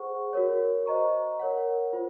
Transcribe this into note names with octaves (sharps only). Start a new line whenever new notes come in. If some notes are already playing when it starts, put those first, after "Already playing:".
Already playing: G#4 C5 F#5 C#6
F#4 A#4 C#5
C5 D#5 A#5 C#6
A#4 C#5 F#5
F4 C5